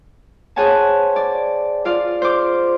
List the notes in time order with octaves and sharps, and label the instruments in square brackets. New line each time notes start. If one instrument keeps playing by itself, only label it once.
[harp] G#4 C5 C#5 F#5 G#5 A5
D5
F4 D5 F5
C5 D6